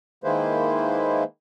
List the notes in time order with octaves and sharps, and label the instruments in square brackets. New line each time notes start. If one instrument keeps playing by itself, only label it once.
[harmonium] D#3 G#3 A#3 E4 B4 C5